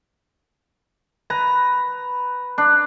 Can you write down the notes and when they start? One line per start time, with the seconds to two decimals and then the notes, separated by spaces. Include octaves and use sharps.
1.30 B4 A#5
2.58 D4